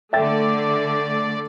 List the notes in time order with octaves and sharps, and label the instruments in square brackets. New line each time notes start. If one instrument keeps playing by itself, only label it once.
[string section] D3 A3 [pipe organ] D5 [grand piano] E5 G5 A6